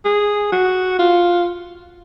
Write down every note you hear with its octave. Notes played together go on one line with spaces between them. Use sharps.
G#4
F#4
F4